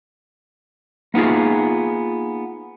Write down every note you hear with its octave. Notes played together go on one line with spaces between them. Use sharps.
A#3 B3 D#4 F4 G#4